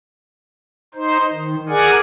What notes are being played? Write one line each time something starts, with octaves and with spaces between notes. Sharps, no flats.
D#4 C5
D#3
G#4 A#4 D5 F#5 G#5